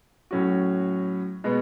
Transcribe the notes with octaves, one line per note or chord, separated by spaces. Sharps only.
A2 F#3 C#4 F#4
B2 G#3 B3